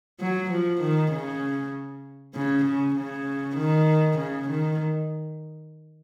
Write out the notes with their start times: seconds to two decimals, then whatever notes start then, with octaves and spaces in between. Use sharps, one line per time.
0.20 F#3
0.51 F3
0.81 D#3
1.12 C#3
2.35 C#3
2.66 C#3
2.96 C#3
3.57 D#3
4.18 C#3
4.50 D#3